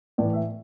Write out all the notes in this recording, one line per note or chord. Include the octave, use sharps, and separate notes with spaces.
A2 E3 D5
E5